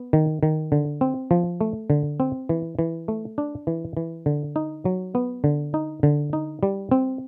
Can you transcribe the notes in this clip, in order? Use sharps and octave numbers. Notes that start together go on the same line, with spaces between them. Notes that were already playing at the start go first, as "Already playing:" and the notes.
Already playing: B3
D#3
D#3
D3
C4
F3
A3
D3
C4
E3
E3
A3
D4
E3
E3
D3
D#4
F#3
B3
D3
D#4
D3
D#4
G3
C4